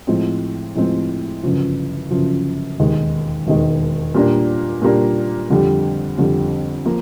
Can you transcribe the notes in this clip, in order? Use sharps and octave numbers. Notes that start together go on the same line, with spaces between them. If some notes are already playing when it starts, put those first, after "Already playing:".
A2 F3 G#3 C4
A2 F3 G#3 C4
G1 F#2 C#3 F3
G1 F#2 C#3 F3
E1 D#2 D#3 G#3
E1 D#2 D#3 G#3
A#2 G3 A#3 D4
A#2 G3 A#3 D4
F2 D3 G3
F2 D3 G3
F3 A#3